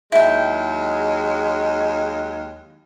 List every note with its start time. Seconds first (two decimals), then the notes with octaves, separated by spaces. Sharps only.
0.12 D#2 F#3 G#3 E4 G5